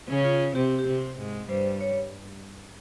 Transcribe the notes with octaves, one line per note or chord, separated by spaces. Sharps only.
C#3 C#4
F4
C3 C4 G4
G4
C3 C4
G#2 G#3
G2 G3 C5
C#5